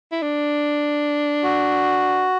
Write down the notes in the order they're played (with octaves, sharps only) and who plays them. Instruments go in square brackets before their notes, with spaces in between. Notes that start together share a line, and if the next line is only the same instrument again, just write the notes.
[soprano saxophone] E4
D4
[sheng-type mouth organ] F#4